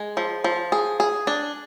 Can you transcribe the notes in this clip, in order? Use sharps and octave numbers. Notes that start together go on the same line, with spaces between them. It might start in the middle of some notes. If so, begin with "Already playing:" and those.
Already playing: G#3
F3
F3
G#4
G#4
D4